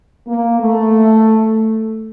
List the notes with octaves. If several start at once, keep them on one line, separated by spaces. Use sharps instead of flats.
A#3
A3